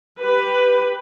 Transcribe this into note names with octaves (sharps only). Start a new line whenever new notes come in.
G4 B4